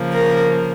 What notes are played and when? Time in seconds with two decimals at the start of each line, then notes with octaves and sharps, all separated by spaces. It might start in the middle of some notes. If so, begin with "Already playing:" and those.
Already playing: C#3 F3 A#3
0.14 A#4